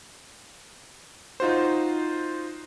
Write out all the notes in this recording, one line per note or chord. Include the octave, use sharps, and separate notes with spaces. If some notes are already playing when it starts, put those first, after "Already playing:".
D#4 F4 F#4 C5